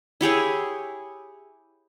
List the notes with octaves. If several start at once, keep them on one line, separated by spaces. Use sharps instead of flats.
E4 G4 G#4 C#5